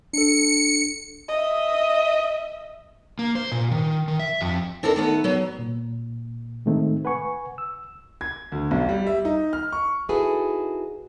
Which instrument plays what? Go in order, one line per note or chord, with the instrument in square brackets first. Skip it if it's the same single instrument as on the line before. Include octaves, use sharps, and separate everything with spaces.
[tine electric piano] D4 A4 [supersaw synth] C#7
[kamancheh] D#5 E5
[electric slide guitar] A#3
C5
A#2
D#3
D#3
E5
F2
[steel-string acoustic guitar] C4 D4 E4 A4 A#4
D#3 A3 B3
F#3 B3
[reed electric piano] A#2
A2 D#3 G#3 A3 C4 D#4
B4 F#5 G#5 C#6
E6
[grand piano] G#6
D2
B1
G3
E5
D#4
F6
C#6
[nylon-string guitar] D#4 E4 F#4 G#4 A4 B4